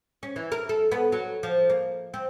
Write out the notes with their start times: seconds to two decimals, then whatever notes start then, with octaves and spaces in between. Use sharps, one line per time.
0.23 C#4
0.36 E3
0.52 A#4
0.69 A4
0.92 B3
1.12 F#3
1.43 F3
1.70 A#3
2.14 C4